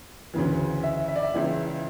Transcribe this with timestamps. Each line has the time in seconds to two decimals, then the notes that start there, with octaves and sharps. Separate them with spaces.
0.34 D2 C#3 E3
0.83 E5
1.08 E5
1.16 D5
1.23 E5
1.34 C#2 C#3 E3